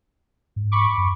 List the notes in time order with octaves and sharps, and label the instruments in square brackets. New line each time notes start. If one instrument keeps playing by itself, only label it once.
[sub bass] G#2
[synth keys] B5 C#6 D6
[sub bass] F#2